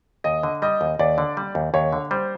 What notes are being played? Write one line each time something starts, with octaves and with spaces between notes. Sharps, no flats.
D#2 D#5
D3
G3 D#5
D#2
D#2 D5
D3
G3
D#2
D#2 C#5
D3
G3 C5